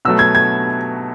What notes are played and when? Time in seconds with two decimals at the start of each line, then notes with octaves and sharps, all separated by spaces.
0.05 B2 F#3 A3 E6
0.19 G#6
0.35 G#6